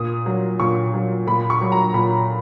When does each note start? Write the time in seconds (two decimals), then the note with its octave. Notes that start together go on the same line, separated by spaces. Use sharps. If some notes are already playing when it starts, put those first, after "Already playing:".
Already playing: A#2 D#6
0.26 F#3
0.60 A#2 C#6
0.94 F#3
1.27 A#2 B5
1.50 C#6
1.61 F#3
1.72 A#5
1.94 A#2 B5